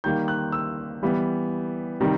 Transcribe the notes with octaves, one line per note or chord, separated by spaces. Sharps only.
D#3 G3 A#3 G6
F#6
E6
E3 G3 B3
C3 D#3 G3